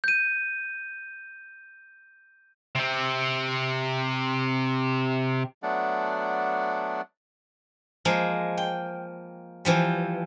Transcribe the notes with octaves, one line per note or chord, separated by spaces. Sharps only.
G6 D#7
C3 C4
F#3 A3 B3 D4 D5 F#5
F3 G#3 A#3
G5
E3 F3 G3